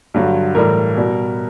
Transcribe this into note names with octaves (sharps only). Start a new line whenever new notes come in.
G2 D3 F#3
A2 E3 G3 A#4
B2 G3